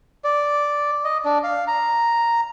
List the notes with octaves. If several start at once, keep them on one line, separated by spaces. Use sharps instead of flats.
D5
D#5
D4
F5
A#5